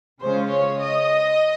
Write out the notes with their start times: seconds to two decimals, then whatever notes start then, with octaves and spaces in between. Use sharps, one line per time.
0.21 C#3 G#3 C#4 F4 C5
0.50 C#5
0.80 D#5